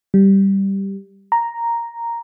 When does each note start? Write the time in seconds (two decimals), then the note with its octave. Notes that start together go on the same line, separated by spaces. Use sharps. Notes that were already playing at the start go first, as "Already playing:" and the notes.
0.14 G3
1.32 A#5